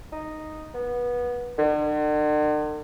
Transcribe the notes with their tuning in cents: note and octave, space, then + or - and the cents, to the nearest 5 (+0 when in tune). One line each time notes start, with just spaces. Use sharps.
D#4 -5
B3 -20
D3 +45